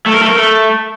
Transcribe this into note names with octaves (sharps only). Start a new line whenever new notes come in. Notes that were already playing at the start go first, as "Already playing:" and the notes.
A3
A#4
A3
A#4
A3